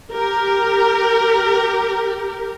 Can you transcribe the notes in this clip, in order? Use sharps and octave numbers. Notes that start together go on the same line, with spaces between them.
G4 A#4